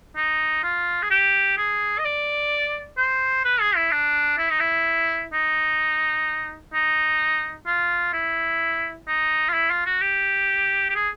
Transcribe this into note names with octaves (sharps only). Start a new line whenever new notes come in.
D#4
F4
G#4
G4
G#4
D#5
D5
C5
B4
G#4
E4
D4
E4
D#4
E4
D#4
D#4
F4
E4
D#4
F4
E4
F4
F#4
G4
G4
G#4